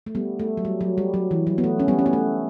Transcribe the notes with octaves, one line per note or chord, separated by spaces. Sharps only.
A3
G3 B3
A3
F#3
G3
F#3
G3
F#3
E3
F#3
B3
A3
C#4
G3 B3
C#4
B3
A3